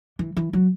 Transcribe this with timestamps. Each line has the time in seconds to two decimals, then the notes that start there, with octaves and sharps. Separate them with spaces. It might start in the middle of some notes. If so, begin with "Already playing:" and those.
0.19 E3
0.37 E3
0.53 F#3